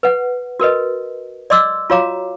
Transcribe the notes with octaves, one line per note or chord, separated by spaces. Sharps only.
B4 F#5
F#4 A#4 B4 D#5
D5 D#5 C6 D6 E6
F4 F#4 C#5 F5 A#5 D6